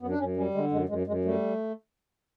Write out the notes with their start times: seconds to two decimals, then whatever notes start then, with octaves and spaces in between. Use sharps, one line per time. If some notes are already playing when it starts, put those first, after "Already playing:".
0.01 F#2 B3
0.10 D4
0.18 F#2 C#4
0.36 G3 C#4
0.54 D3 G#3
0.71 F#2 G#3
0.89 F#2 G#3
1.07 F#2 G#3
1.25 G3 A3